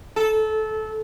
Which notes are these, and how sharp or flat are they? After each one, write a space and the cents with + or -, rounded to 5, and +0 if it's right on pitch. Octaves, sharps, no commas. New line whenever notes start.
A4 -20